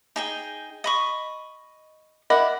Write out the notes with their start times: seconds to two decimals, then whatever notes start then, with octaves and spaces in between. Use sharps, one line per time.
0.16 D#4 G#4 G5 G#5
0.84 D#5 B5 C#6
2.30 E4 A#4 D5 D#5 F#5 B5